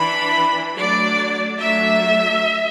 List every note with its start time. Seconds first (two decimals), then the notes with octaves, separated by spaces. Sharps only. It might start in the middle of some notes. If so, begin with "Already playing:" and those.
Already playing: E3 D4 B5
0.76 F#3 A3 D4 D5
1.60 F#3 A3 D4 E5